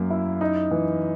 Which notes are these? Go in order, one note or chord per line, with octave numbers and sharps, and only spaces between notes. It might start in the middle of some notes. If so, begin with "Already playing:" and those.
Already playing: F#2 A#3
E4
D#4
E3